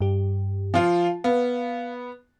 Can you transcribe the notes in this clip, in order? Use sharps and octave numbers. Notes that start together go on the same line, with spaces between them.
G2 G4
F3 F4
B3 F5